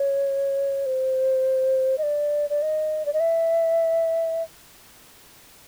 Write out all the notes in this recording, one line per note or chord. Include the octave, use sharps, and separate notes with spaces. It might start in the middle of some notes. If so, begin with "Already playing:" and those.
Already playing: C#5
C5
D#5
D5
D5
D#5
D5
D#5
E5